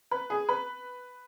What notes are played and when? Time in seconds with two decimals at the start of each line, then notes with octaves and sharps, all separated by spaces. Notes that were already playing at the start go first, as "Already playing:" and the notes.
0.11 B4
0.30 G#4
0.49 B4